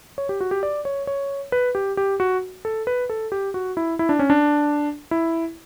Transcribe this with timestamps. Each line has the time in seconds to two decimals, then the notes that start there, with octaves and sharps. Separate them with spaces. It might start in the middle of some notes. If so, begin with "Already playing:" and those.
0.18 C#5
0.29 G4
0.41 F#4
0.51 G4
0.63 D5
0.85 C#5
1.07 C#5
1.52 B4
1.75 G4
1.97 G4
2.20 F#4
2.65 A4
2.87 B4
3.10 A4
3.32 G4
3.54 F#4
3.77 E4
3.99 E4
4.09 D4
4.19 C#4
4.30 D4
5.11 E4